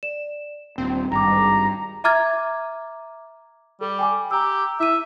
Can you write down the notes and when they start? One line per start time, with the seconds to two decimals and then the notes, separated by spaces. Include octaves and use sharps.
0.03 D5 E7
0.78 D#1 C4 D4
1.12 G#1 G2 G5 A#5 D6
2.04 E5 A#5 D6 F6 G#6 A6
3.81 G3 A4
3.99 G5 G#5 D6
4.31 G4 A#5 E6
4.80 E4 E5 D#7